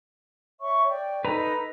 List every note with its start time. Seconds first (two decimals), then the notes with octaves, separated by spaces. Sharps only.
0.60 C#5 E5 C#6
0.88 D5 G5
1.25 D#4 A4 B4 A#5